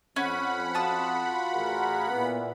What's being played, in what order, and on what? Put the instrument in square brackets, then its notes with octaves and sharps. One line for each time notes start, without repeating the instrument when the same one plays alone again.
[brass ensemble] F2 [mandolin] C#4 [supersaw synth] F#5 B5
[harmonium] F4 F#4 [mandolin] A5 D#6
[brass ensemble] A1 G#4 A#4
[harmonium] A#2 E3 [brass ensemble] B3